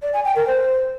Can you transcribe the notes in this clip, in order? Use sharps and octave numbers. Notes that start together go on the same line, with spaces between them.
D5
G#5
G5
A#4
C5